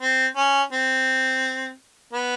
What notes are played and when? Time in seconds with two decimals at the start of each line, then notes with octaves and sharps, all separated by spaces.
0.02 C4
0.37 C#4
0.73 C4
2.13 B3